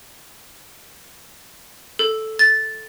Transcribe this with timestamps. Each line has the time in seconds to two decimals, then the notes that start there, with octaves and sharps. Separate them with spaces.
1.99 A4
2.39 A6